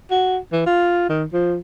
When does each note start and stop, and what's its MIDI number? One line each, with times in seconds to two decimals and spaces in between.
0.11 0.38 66
0.52 0.64 52
0.66 1.09 65
1.09 1.24 51
1.33 1.57 53